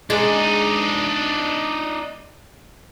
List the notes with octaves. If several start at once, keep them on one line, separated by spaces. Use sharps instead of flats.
G#3 D4 D#4